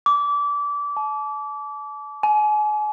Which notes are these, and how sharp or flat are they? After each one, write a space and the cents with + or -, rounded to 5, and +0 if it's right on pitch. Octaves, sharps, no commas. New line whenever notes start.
D6 -25
A5 -40
G#5 +35